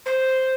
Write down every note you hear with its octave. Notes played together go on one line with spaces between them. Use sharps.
C5